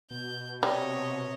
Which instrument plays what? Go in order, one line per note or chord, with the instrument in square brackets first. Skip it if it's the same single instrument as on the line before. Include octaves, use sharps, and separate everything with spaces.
[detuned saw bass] B2 [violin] G6
[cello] C3 [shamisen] G3 [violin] C#5 D#5